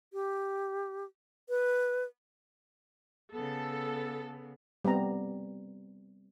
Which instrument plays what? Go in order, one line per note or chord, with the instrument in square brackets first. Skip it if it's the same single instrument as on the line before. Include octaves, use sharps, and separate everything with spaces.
[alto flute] G4
B4
[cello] C#3 B3 [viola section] A4
[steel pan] G3 B3 C4 A#5